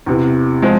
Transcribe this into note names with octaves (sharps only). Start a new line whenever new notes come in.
E2 C3 E3
F3 G#3 C4